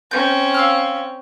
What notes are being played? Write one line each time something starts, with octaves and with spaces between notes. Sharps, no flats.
C4 C#4 G6
F5 E6 F6